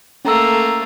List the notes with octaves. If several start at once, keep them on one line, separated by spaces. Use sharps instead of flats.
A3 A#3 C#4 A#5 E6